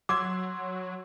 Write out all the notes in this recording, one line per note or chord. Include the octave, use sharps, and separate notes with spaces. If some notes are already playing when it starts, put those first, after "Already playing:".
F#3 C6 D6 E6 G#6